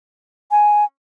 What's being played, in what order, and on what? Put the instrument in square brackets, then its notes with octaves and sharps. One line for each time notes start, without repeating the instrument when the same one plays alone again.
[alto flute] G#5